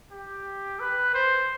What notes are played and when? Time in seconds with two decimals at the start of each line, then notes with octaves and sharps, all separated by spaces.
0.12 G4
0.80 B4
1.14 C5